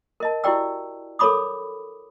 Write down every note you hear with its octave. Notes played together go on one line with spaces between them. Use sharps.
A#4 D#5 A5
E4 F#4 G4 D5 G5 E6
A4 A#4 C#5 B5 D6 D#6